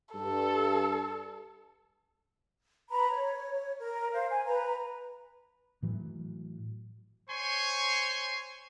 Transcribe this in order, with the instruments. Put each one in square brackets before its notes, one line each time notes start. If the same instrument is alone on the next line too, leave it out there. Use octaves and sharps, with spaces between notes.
[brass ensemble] G2 [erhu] A4
[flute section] B4 A#5 B5
C#5
A#4
C5 F5
G#5
B4 A#5
[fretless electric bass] A2 E3 F#3
[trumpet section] C5 C#5 G#5 C6 C#6